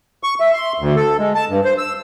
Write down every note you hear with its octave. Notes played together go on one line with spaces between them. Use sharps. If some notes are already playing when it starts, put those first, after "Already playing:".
C#6
E5
C6
D2
A4
G#3
A5
G2
C5
E6